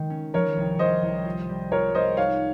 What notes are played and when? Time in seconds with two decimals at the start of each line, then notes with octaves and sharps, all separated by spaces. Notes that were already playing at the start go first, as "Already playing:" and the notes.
Already playing: D#3 G#3
0.10 C#4
0.34 F3 A#4 C#5
0.56 C2
0.79 C2 C5 D#5
1.02 C2
1.25 F4
1.49 G3
1.72 F4 A#4 C#5
1.95 G3 C5 D#5
2.17 D#4 C#5 F5